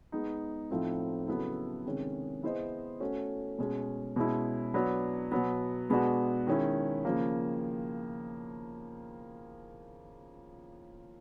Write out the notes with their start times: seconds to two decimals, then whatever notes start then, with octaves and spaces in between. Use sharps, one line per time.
0.12 G#3 B3 D#4
0.71 A2 F3 A3 C4 D#4
1.28 C#3 F#3 B3 E4 A4
1.85 C3 D#3 G#3 C#4
2.43 B3 E4 G#4 C5 D#5
3.00 A3 C#4 F#4
3.58 B2 G#3 C#4
4.16 B2 G#3 C#4 E4
4.74 F#3 B3 D4
5.32 B2 F#3 B3
5.90 B2 G#3 B3 D4 F#4
6.47 D#3 G#3 C#4 E4
7.05 C#3 F3 A#3